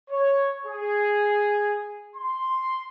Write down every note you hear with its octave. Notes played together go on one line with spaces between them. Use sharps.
C#5
G#4
C6